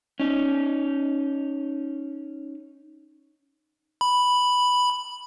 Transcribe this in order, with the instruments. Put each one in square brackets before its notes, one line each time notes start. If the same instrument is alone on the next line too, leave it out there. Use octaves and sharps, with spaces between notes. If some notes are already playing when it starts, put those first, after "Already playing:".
[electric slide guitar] C#4 D#4
[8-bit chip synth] B5